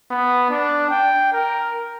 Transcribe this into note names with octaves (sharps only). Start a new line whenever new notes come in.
B3
D4
G5
A#4